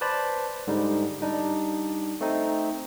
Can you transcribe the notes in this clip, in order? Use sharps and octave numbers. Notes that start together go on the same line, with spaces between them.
B4 C5 D5 A5 B5
G#2 D3 G3 D#4
G3 D4 D#4
A3 C4 D#4